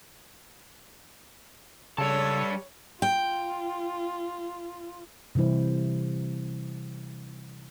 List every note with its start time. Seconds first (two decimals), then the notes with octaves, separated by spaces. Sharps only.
1.98 C#3 G3 A4 C#5 A5
3.02 F4 G5
5.35 C3 E3 G3 E4 C5